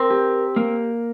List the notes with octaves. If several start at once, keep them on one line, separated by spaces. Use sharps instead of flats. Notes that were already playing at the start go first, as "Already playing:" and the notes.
Already playing: C4 A#4
G4
A#3